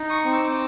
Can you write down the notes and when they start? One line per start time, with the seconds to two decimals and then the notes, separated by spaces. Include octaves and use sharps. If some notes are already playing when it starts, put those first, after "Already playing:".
Already playing: D#4
0.09 C#6 D#6
0.25 C4
0.33 D6 E6